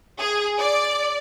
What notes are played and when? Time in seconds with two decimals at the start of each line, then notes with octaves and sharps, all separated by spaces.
0.19 G#4
0.60 D5